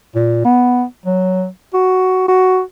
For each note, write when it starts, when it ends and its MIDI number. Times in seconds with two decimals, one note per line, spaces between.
0.15 0.42 46
0.45 0.84 59
1.06 1.48 54
1.74 2.27 66
2.28 2.61 66